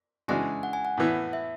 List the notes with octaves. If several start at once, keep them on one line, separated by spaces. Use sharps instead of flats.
C#3 E3 G#3 D4 F#4 G#5
F#5
G#5
F#5
A2 E3 B3 E4
E5